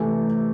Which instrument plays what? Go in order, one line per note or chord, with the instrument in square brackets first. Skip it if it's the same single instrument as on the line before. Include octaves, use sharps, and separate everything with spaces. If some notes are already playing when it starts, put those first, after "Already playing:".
Already playing: [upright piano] C3 E3 A3